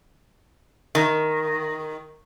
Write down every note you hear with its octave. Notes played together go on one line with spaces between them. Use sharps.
D#3